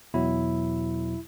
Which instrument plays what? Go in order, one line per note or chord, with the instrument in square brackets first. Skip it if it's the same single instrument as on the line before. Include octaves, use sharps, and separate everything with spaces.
[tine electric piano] E2 B2 F#3 E4